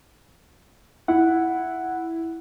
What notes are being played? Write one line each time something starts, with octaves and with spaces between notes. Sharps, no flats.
E4 F#5